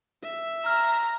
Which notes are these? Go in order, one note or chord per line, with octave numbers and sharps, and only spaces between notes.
E5
A#5 F6